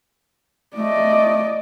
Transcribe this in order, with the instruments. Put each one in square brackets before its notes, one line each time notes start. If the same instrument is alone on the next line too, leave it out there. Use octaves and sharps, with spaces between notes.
[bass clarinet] A3 [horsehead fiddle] D5 D#5